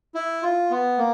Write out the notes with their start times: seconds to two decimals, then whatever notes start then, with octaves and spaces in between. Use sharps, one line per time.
0.15 E4
0.43 F4
0.71 B3
0.98 A#3